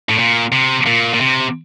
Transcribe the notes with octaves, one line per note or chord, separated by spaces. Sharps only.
A2
A#2
C3
A#2
A#2
C3